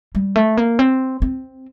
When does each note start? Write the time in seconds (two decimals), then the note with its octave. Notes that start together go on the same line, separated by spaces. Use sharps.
0.15 G3
0.36 A3
0.57 A#3
0.79 C4
1.22 C4